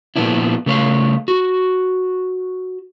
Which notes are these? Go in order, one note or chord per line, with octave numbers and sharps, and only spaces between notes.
A#2 C#3 F3 B3 D4 E4
C#3 A3 C#5 F5
F#4